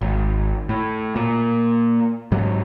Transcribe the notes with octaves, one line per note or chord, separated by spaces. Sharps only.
G#1
A2
A#2
G#2 F#3